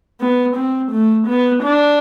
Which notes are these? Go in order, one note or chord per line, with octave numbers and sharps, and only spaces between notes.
B3
C4
A3
B3
D4